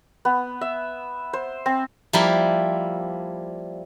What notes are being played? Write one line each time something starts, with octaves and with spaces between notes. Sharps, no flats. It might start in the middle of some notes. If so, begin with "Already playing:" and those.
B3
E5
C5
C4
F3 G3 A#3 E4 G4 A#4